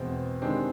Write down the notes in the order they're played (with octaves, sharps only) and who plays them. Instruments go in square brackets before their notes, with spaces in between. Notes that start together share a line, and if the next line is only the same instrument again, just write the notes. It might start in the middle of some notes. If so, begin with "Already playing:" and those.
Already playing: [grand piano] E2 B2 G#3 [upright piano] C4
[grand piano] D#3 G#3 B3 D4 G4 [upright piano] C4